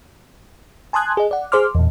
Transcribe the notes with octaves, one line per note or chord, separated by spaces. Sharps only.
G#5 A5 C6 D#6 F#6 G#6
G#4 D#5
D5 F#5
G#4 C5 C6 D6 F6
E2 A#2